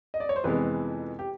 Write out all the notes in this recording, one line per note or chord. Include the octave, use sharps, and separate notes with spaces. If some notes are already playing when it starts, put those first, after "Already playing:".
D#5
D5
C#5
C5
F2 C3 E3 G#3 B3 B4
G4